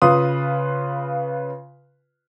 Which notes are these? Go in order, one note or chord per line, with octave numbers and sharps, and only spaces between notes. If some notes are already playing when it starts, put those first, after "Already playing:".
C#3 F4 B4 C6 D#6